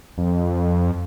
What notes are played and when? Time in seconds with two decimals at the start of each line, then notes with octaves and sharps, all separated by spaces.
0.18 F2